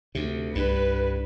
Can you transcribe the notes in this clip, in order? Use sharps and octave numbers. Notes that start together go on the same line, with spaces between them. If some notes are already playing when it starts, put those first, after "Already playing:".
D2 C3
C2 G2 B4